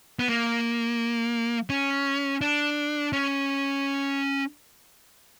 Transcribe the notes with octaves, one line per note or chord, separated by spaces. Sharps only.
B3
A#3
C#4
D4
C#4